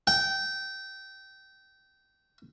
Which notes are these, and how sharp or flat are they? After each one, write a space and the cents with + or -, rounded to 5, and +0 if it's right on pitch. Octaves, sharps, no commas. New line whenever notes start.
G5 -20